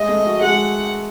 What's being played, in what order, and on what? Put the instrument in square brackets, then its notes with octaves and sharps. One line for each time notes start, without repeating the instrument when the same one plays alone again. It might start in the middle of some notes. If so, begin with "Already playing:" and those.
Already playing: [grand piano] G#3 [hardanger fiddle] D#5
[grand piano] A3
F#4
[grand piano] G#3 [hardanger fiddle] F#5